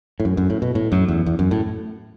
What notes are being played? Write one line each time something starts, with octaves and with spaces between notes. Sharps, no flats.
A2
F#2
F#2
A2
B2
A2
F#2
E2
E2
F#2
A2